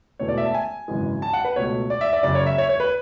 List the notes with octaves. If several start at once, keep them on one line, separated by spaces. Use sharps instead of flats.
E1 E2 B2 A3 C#5
D5
E5
A5
G#5
G#1 F#2 C#3 E3 G#3
A5
F#5
B4
C#2 B2 A3 C#5
D5
E5
D5
F#1 F#2 C#3 D5
C#5
E5
C#5
C#5
B4